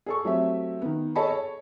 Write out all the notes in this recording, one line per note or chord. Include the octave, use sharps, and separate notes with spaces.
G#4 A4 C#6
F#3 A3 C4 G4 E5
D#3 B3
G#4 A4 C#5 D#5 A5 B5
C#5